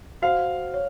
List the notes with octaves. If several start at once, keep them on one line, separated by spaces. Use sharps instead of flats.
F#4 C5 F5 F#5
C#5